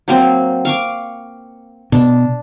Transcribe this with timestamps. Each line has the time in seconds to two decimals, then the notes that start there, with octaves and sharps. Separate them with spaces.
0.08 F#3 A#3 C4
0.65 F5 C#6 D6
1.92 B2 D4